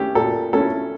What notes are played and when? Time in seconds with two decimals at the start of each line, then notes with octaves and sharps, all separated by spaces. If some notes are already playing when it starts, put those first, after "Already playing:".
Already playing: A3 C#4 E4 G4
0.15 A#2 A4
0.53 A3 C#4 E4 A4